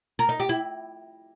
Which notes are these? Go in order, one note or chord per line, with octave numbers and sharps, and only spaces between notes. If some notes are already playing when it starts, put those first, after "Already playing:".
A#4
D#4
G4
E4